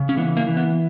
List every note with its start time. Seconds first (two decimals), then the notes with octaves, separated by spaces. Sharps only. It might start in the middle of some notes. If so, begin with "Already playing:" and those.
Already playing: C#3
0.09 C#4
0.17 E3 B3
0.37 A#3
0.47 E3
0.57 B3